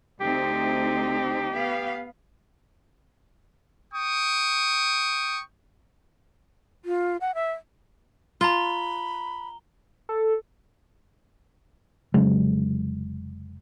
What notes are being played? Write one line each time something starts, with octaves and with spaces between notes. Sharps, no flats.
D2 C4 D#4 G4
B3 F5
G5 C#6 D#6
F4
F#5
E5
F4 A#5 B5 G7
A4
F1 C#3 F#3 G#3